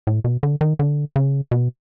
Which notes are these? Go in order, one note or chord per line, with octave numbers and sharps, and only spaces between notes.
A2
B2
D3
D#3
D3
C#3
B2